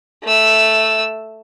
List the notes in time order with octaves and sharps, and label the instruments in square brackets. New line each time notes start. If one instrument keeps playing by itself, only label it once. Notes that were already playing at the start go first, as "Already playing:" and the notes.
[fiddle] A3 E6